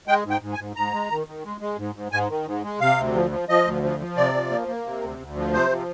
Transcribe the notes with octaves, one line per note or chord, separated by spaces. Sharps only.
G#3 G5
G#2
G5
G#2
G#5
G#2
G#2 A#5
G#3
D#3
D#3
G#3
G#3
G#2
G#2
G#2 G#5
D#3
G#2
G#3
C3 F5
D2
F3
F3
F3 D#5
D2
F3
F3
C3 D5
F3
A#3
A#3
C3
D2
D2
F3
C3 C5
F3